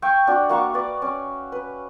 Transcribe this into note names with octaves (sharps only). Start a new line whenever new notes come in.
E5 F5 G5 C#6
D4 F#4 F#5
A#3 F#4 F5 C#6
B4 D5
C#4
B4